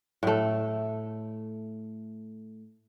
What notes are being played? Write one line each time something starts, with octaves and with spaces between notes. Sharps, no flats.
A2 A3